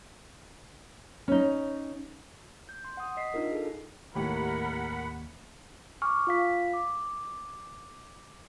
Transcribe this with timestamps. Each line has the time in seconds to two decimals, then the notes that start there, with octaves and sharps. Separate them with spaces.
1.28 C#4 D#4
2.69 G6
2.85 C6
2.97 F#5 D#6
3.17 D#5 B6 C7
3.34 D4 D#4 F4 A#4
3.52 G#4 A4
4.15 D#2 A2 G4 A#4 F#5 B5
6.02 G#5 C#6 D6 F6
6.27 F4 F5 B6
6.73 D6